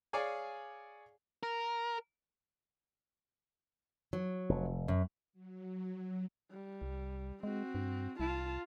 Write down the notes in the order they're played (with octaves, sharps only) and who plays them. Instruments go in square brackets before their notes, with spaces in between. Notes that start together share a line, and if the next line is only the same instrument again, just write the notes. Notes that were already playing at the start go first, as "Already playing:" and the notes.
[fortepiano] G#4 C#5 D5 F5 G#5
[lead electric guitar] A#4
[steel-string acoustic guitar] F#3
[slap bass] F1
[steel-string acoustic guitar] F#2
[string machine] F#3
[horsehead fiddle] G3
[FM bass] C2
[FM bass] G#3 [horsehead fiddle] C4 F#4
[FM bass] G2
[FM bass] C2 [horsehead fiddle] F4 A5